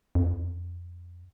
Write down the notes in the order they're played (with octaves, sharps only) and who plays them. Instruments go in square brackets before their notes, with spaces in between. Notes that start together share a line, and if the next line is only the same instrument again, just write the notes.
[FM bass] F2